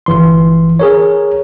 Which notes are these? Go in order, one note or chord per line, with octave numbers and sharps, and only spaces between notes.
G1 E3 C6
G#4 A#4 C#5